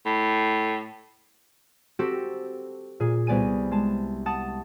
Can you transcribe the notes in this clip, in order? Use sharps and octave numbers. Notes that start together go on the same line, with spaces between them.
A2
C4 F#4 G4 A4
A#2 G#4
C2 B3 D5 G#5 D#7
G#3 A5
F#5 A5 D#6 A6